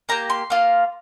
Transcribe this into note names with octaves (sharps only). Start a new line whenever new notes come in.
A#3 G4 A#5
C6
A#3 F4